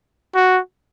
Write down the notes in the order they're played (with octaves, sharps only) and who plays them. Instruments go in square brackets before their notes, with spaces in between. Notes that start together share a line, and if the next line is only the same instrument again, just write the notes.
[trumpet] F#4